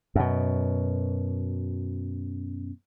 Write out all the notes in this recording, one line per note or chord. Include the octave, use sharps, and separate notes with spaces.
F#2 B2